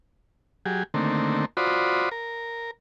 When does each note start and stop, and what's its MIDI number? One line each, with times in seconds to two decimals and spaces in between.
0.66 0.83 54
0.66 0.83 67
0.66 0.83 68
0.94 1.45 50
0.94 1.45 51
0.94 1.45 57
0.94 1.45 58
0.94 1.45 60
1.57 2.09 65
1.57 2.09 66
1.57 2.09 72
1.57 2.09 74
1.57 2.09 83
1.57 2.09 87
2.11 2.71 70